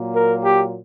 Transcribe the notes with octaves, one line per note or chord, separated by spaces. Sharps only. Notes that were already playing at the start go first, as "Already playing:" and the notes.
Already playing: A#2 F#3 A#3
A#4
G4